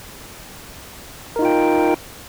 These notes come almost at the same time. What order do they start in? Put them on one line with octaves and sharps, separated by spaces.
A#4 D#4 F4 G5